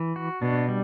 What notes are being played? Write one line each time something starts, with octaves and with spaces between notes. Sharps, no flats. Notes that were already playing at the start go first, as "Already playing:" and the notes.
Already playing: E3
F#4
B2 D4
G3